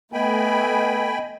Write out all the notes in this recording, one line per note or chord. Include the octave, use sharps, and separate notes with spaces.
A3 B3 D#5 G5 G#5 B5